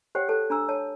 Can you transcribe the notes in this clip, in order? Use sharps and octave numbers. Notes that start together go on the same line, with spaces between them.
G4 C5 C#5 F#5 G5
A4 C5 A5
D4 A#5 E6
C#5 A5